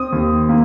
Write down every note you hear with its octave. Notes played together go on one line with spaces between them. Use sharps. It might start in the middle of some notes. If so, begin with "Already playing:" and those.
Already playing: C4 D#6
D#2
A#3